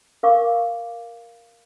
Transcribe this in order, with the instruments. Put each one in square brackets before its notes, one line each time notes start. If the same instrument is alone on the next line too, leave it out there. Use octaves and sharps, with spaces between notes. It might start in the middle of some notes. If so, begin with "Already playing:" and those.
[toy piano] A#4 F5 C#6 D6